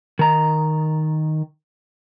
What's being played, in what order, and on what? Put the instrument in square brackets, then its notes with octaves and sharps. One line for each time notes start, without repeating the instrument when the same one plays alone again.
[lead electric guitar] D#3 A#5